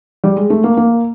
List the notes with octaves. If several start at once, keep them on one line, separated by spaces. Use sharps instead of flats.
G3
G#3
A3
A#3
A#3